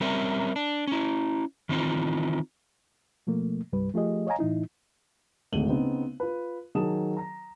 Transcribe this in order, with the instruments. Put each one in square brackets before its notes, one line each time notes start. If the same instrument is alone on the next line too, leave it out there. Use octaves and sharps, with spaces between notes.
[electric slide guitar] G3 C4 C#4 A#4 E5
D4
C#4 E4
D#3 E3 C4 D#4 F4
[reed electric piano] B2 F3 A3 A#3
C2 G2 G3 B4
F3 A3 F4 G4 G#4 D#5
C#5 D#5 F5 G#5 A#5
A2 E3 D#4 E4
[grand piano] D1 G#1 A3 D#7 F#7 G7
C#3 B3 C4 D#4
F4 B4
D#3 F#3 G#4 A5 D#6 E7
A#5 A#6